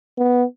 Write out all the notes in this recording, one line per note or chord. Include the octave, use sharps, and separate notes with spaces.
B3